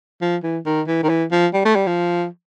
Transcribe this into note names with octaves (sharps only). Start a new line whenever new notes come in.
F3
E3
D#3
E3
D#3
E3
F3
G3
A3
G3
F3